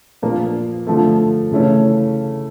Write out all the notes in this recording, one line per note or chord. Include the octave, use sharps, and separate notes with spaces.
A#2 F3 A#3 D4
D3 F3 A3
C#3 E3 A3 C#4